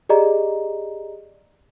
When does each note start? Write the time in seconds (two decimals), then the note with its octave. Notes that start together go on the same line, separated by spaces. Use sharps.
0.09 G4 G#4 D5 D#5 A#5